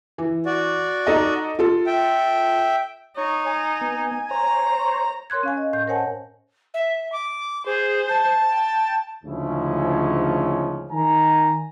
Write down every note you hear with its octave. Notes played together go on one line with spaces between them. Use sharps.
E3
F#4 D5
D#4 A4 D#5
F4 A4
E5 G5
D#4 C#5
G#5
B3
C5 C#5 A#5
A#4 C#5 C6 F#6 G#6
C#4 F5 G#5
D#5
A2 G6
A#4 C5 C#5 F#5 G#5 A5
E5
D6
G#4 C5
A5
G5
D2 G#2 C#3 F3 C#4 E4
D#3 G#5 A#5